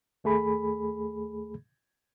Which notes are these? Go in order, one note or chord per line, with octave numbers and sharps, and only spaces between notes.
D#2 A3 G#4 B5